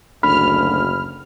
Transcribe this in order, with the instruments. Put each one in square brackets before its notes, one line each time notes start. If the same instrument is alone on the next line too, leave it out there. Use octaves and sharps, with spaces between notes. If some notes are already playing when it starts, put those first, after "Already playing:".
[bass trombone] F#1 [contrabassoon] D2 [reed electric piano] B5 [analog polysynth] F6